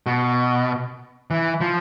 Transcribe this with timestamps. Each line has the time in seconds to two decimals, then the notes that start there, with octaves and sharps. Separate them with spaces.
0.06 B2
1.31 E3
1.61 F3